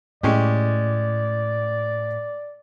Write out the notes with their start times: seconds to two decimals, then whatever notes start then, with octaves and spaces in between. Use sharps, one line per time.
0.23 A2 G#3 C#4 G4 D5